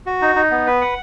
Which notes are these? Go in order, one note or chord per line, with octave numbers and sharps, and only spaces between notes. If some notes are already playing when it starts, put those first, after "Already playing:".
F#4
D#4
D#4
B3
B4
F#5